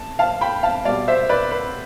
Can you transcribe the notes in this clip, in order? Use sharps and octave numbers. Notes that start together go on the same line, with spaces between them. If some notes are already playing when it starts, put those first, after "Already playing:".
Already playing: A5
F5 A5
G5 B5
F5 A5
B2 G3 D5 F5
C5 E5
B4 D5
B4